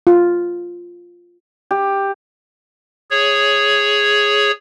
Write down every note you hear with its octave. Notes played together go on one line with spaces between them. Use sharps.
F4
G4
G#4 C#5